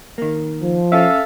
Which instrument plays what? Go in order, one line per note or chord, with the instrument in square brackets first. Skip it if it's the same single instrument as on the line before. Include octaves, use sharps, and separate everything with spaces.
[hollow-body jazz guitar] D#3 A#3
[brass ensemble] F3
[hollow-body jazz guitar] C#4 [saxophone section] A4 E5 F5